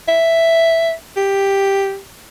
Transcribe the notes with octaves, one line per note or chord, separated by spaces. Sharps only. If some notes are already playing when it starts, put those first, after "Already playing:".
E5
G4